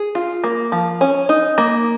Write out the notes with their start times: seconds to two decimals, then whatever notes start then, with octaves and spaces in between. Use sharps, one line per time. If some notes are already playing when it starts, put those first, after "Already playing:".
Already playing: G#4
0.15 F4
0.44 A#3
0.72 F3
1.01 C#4
1.29 D#4
1.58 A#3